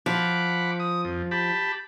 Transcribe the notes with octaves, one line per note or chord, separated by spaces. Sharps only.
F3 F#5 B5 D6
D#6
F2
G4 A5 B5